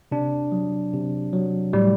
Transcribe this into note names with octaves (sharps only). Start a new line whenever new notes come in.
C3 D4
F#3
C3
F#3
A2 G3